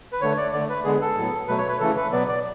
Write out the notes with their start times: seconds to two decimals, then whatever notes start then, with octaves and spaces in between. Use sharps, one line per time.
0.12 B4
0.21 D3 A3 C#5
0.37 D5
0.53 D3 A3 D5
0.69 B4
0.84 D3 G#3 B3 G#4
1.01 A4
1.17 A2 F#3 B3
1.48 B2 F#3 A3 B4
1.58 C#5
1.68 B4
1.80 C#3 E3 A3 A4
1.96 B4
2.12 B2 F#3 B3 D5
2.28 D5